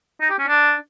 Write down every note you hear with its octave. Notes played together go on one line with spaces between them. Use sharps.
D#4
G4
C#4
D4